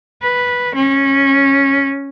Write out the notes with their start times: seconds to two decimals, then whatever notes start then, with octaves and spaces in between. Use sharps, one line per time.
0.23 B4
0.75 C#4